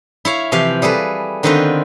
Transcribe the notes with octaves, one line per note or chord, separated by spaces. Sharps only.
E4 C#5 F5
C3 E3 F3 G4 F5
G3 G#4 A4 B4
D3 D#3 B3 C4 F4 B4